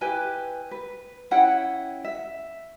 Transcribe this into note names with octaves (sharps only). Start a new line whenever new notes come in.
E4 G4 B4 G#5
B4
C#4 E4 F#5 G5
E5